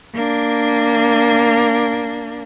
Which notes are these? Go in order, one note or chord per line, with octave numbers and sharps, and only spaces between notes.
A#3 D4